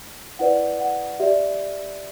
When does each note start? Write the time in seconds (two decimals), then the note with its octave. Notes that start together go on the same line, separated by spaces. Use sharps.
0.39 E4 B4 D5 F#5
0.80 F#5
1.19 G4 D5 E5